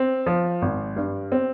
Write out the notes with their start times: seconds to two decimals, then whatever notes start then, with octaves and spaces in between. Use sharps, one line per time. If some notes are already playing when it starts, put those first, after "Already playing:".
Already playing: C4
0.26 F3
0.62 G#1
0.96 G2
1.32 C4